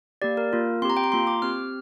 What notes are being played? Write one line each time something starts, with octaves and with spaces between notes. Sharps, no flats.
A#3 G4 D5
A#4
A#3 F4
C4 G4 A#5 C6
G5
A#5
A#3 F4 C6
D6
C4 G4 F6